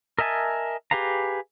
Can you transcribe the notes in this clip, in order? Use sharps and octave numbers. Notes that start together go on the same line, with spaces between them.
A#4 D#5 E5 G#5 A5
G4 G#4 B4 F5 A#5